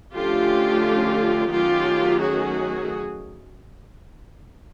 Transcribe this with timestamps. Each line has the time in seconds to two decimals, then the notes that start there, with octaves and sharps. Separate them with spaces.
0.14 D3 F3 A3 C#4 F4 G4
1.51 D#3 F#3 A3 C#4 F4 G4
2.21 F#4 G#4